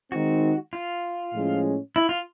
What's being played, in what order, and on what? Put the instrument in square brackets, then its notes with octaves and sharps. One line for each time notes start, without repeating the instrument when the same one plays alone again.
[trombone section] D#3 G#3 C4 D#4 [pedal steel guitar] F#4
[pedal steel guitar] F4
[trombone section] A2 F3 G#3 C#4
[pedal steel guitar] E4
F4